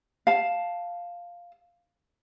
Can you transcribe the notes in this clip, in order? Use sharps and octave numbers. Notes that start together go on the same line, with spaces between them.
F5 A5